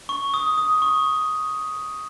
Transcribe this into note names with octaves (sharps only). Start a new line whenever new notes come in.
C#6
D#6
D#6
C#6